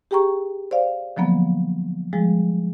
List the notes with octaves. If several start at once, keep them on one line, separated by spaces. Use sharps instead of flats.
G4 G#4 G5 A#5 C#6
C5 D5 F5
D3 F3 F#3 A#3 B3
F3 G3 G#3 G#4